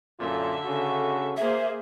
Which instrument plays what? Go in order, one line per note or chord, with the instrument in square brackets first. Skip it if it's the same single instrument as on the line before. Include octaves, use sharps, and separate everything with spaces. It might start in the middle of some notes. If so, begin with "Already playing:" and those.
[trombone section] F#2 A#2 F4 [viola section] D3 E5
[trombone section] C#3 F#4
[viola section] A#3 G#4 C5 [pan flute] E5